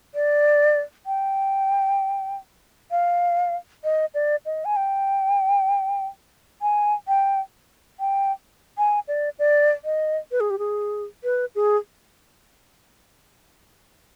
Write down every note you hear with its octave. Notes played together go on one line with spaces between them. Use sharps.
D5
G5
F5
D#5
D5
D#5
G#5
G5
G#5
G5
G5
G#5
D5
D5
D#5
B4
G#4
G4
G#4
B4
G#4